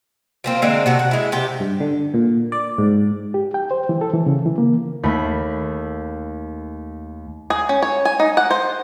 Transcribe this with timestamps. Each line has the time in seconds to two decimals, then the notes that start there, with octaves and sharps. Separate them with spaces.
0.44 F3 A#3 C4
0.62 D3 G#3 A#3 C4
0.86 C3 F#4 A4
0.99 F#5
1.11 G#3 E4
1.32 C3 G4
1.60 G2
1.80 D3
2.14 A#2
2.52 D5
2.78 G#2
3.34 G4
3.54 G5
3.71 C5
3.89 E3
4.01 A4
4.14 E3
4.26 C#3
4.45 E3
4.58 A#3
5.03 D#2 A3 B5
7.50 G#4
7.69 C#4
7.82 C#5
8.05 G#5
8.20 D#4
8.37 F#5
8.51 C5